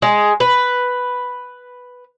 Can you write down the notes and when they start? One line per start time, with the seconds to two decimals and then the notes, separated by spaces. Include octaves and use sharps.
0.02 G#3
0.40 B4